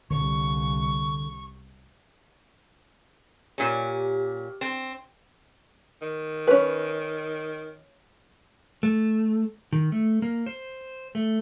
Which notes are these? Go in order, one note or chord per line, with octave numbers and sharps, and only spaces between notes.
C2 D3 C#6
A#2 C#4 G4
C4
D#3
C#4 B4
A3
D#3
A3
A#3
C5
A3